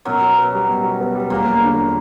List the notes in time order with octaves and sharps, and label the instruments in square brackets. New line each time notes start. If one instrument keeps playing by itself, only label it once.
[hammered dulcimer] F#2 F#3 [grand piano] B2
[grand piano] F#4
B3
G3
B2
F#4
B3
G3
[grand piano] E1 [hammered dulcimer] A#2 A#3
[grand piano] E1
D3